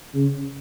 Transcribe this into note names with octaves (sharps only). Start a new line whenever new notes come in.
C#3